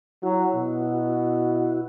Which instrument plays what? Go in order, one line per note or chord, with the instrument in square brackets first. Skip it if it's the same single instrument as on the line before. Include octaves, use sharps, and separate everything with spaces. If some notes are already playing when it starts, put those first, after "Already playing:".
[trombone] F#3 [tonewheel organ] E4 F#4
[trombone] B2